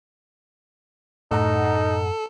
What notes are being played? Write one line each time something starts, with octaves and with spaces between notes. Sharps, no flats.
F#2 A2 D#4 A4 F#5 A#5